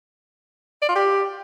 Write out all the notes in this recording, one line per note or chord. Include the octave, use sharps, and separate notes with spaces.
D5
F4
G4